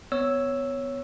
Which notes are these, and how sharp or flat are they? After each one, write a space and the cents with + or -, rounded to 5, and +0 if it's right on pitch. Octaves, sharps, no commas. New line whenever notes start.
B3 +20 C#5 +0 E6 +0